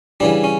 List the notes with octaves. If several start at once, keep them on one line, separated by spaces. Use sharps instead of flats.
C#3 E3 G3 D4
C#4